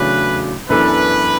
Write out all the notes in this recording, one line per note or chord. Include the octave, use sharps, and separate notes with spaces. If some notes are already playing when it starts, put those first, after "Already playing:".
Already playing: E2 C#3 F#3 A3 D4 B4
F#2 E3 B3 D4 A4 B4